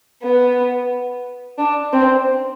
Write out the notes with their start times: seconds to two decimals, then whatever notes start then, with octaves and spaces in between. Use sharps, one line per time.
0.23 B3
1.59 D4
1.92 C4